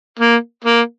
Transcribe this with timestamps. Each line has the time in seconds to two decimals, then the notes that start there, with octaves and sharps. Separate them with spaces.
0.19 A#3
0.64 A#3